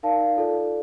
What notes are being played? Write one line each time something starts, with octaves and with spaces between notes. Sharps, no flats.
D#4 A#4 D5 F5 A5
F4 A4 D5